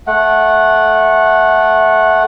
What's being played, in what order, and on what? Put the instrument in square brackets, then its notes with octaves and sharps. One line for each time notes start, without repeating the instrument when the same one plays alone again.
[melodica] A3 F#5